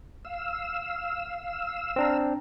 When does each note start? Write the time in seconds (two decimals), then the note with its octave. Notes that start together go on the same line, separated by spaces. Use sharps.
0.25 F5 E6
1.96 C4 D4 A#5